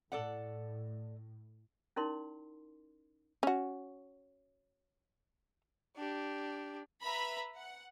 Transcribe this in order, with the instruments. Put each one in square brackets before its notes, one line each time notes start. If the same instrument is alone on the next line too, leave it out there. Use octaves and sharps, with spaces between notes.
[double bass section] A2 [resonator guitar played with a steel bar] A4 D5 F#5
[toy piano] C#4 D#4 E4 A#4 D5 C6
[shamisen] C#4 F#4
[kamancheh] D4 G4
[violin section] B4 E5 A#5 B5
F#5